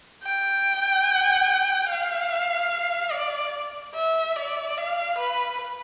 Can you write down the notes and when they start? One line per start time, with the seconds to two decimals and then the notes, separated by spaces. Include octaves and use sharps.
0.24 G5
1.89 F5
3.12 D5
3.95 E5
4.36 D5
4.77 F5
5.18 B4